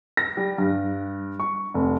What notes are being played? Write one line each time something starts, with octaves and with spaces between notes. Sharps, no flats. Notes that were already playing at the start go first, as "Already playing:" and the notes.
A#6
G3
G2
C#6
F1